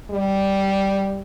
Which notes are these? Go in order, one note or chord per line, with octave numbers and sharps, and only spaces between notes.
G3